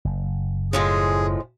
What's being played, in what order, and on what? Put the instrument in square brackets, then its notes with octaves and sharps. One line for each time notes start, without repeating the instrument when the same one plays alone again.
[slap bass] F#1
[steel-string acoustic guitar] A2 F3 G#3 [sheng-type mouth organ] G#4